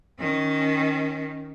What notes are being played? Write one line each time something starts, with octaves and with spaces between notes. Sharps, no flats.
D#3 C#4